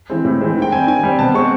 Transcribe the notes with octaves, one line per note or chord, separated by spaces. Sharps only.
E3 G#3 C4
A2
E3 G#3 C4
D#3
G5
G3 C4 G#5
D#3 G#5
G3 C4
B2 A5
G#3 C4 C#6